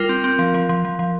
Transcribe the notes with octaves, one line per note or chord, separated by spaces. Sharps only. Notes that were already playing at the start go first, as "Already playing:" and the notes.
Already playing: G3 F4 A#4
C4
C4
F3
F3
F3
F3
F3